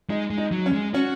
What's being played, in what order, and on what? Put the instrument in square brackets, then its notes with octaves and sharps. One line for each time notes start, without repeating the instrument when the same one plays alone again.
[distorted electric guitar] G#3 [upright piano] D#4
[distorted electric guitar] G#3
[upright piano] D#4
[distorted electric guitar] F#3
[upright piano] C#4
[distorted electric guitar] G#3
[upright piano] C#4 [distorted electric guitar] F#4